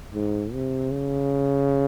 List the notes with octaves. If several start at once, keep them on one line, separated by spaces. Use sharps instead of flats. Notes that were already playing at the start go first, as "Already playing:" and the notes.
G#2
C3
C#3